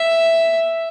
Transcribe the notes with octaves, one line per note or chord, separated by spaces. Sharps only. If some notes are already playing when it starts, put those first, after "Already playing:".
Already playing: E5